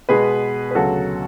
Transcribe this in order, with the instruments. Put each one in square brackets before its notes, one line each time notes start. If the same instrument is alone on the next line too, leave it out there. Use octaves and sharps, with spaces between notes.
[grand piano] B2 G#3 B3 G#4 B4
B4
D2 C#3 F#3 F#4 A4